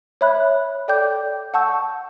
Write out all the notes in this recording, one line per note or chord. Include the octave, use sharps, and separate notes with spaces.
C#5 E5 B5 F#6
A4 D5 G5 D6 G6
F#5 A5 C#6 E6 G6